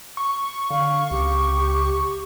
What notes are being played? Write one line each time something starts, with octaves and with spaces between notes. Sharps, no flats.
C#6
D3 F5
C#2 G4